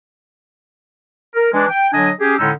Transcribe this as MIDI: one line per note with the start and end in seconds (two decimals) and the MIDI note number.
1.35 1.49 70
1.52 1.65 52
1.52 1.65 56
1.52 1.65 62
1.69 1.87 79
1.93 2.10 50
1.93 2.10 54
1.93 2.10 62
1.93 2.10 75
1.93 2.10 80
2.20 2.36 61
2.20 2.36 67
2.20 2.36 68
2.38 2.51 45
2.38 2.51 50
2.38 2.51 56
2.38 2.51 61
2.38 2.51 63
2.38 2.51 88